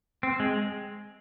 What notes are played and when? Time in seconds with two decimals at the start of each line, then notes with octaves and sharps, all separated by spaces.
0.23 C4
0.40 G#3